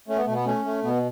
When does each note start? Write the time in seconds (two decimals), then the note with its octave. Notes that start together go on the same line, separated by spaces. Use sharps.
0.08 A3 C#4
0.17 B3
0.25 B2 A3
0.34 B3
0.46 A3 C#4
0.65 A3
0.83 B2 B3